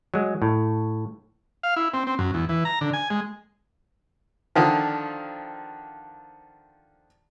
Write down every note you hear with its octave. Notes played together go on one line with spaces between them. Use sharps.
F#3 G#3
A2
F5
E4
C4
C4
F#2
E2
E3
A#5
D3
G#5
G#3
D3 D#3 F3